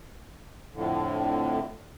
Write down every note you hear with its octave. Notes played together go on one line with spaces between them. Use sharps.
F2 A2 D3